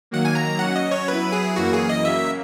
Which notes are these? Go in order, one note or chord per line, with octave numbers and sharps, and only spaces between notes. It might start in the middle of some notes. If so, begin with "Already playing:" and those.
D#3 F#3 A#3 F#5
G#5
A#5
F#3 C#4 F#4 F#5
D#5
C#5
F#3 B3 E4 B4
G#4
F#2 E3 A#3 F#4
G#4
D#5
C#3 F#3 A#3 E5